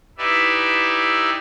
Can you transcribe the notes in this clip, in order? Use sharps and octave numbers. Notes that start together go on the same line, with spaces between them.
D#4 E4 G4 B4 D5 E5